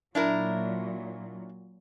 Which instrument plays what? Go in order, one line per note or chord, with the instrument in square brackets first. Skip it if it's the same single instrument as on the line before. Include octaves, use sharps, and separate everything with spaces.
[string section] A#2 F#3 [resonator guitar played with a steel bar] D4 E4 A#4